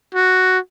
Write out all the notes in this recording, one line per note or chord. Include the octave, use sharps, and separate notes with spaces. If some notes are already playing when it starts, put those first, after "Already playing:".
F#4